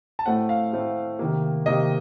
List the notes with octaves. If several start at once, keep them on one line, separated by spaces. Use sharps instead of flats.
A5
A2 A3 C4 F#5
F5
A2 A3 C4
C3 D#3 A#3
C3 D#3 A#3 D#5